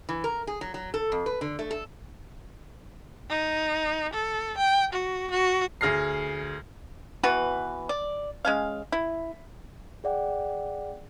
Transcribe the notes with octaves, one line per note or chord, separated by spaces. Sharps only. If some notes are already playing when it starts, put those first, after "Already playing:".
E3
A#4
G#4
F#3
F#3
A4
F2
B4
D3
A3
A4
D#4
A4
G5
F#4
F#4
D2 G#4 F6 A#6 C7
E3 B3 F#4 B4
D5
G#3 C#4 F5
E4
G#4 D5 F#5 G5